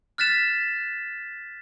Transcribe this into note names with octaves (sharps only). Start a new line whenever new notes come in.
F6 F#6 A6 B6 E7